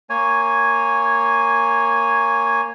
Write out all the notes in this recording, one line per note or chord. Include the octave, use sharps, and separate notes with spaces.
A#3 C#5 G#5